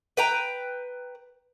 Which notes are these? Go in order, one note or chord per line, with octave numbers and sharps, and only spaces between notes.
B4 G5 A#5